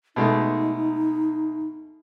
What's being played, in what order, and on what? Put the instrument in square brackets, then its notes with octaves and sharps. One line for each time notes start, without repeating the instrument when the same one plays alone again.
[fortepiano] B2 G#3 A3 [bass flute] D#4